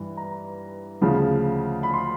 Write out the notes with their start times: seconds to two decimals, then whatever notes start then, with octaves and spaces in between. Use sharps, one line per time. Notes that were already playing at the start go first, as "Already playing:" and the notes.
Already playing: G2 E3
0.17 A#5
1.01 D2 C#3 F3
1.83 B5
1.94 C6